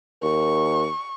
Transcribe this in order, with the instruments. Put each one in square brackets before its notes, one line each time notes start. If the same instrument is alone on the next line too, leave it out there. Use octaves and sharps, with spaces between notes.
[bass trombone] D#2 [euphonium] A#4 [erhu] C#6